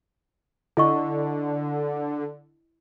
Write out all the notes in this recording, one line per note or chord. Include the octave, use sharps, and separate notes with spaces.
D3 E4 D#5 C#6